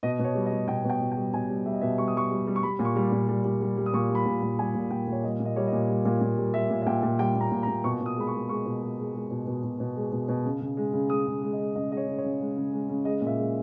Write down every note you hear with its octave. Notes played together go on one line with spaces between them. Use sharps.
B2 D#5
B2
C#5
G3
D#5
G3
B2 G5
B2
G5
B2
G5
G3
B2 G#5
G3
G3 E5
D#5
B2 E5
G3 C#6
D#6
G3 C#6
G3
G3
C#6
G3 B5
A#2
C#6
G3
A#2
G3
G3
G3
G3
D#6
A#2 C#6
G3
B5
A#2
A#2
G3 G#5
A#2
A#2 G5
A#2
C#5
G3 D#5
A#2
D#5
G3 C#5
D#5
A#2
G3
A#2
A#2
G3
G3 E5
A#2
E5
A#2 G5
A#2
G3 G5
A#2
A#5
A#2
A#5
A#2
B2 C#6
B2 D#6
G#3 B5
C#6
G#3
G#3 C#6
B2
G#3
G#3
G#3
B2
B2
B2
B2
G#3
B2
B2
C#3
C#3
G#3
C#3
G#3 D#6
C#3
G#3
D#5
G#3
C#3 D#5
G#3 D#5
C#5
C#3
C#5
C#3
G#3
C#3
G#3
C#3
G#3 D#5
A#2
E5
G#3